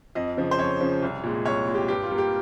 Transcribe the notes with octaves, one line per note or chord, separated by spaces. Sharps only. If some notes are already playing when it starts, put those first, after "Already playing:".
F2 D#5
C#3 F3
C5
F2 C#5
C#3 F3
C2
A#2 G#3
C2 C#5
A#2 G#3
G4
G2 G4
F4
G3 A#3
G4